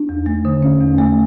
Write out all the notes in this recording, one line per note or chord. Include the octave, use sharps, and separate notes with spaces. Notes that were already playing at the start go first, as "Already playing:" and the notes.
Already playing: D4
E2
A3
D3
C#4
E2
A3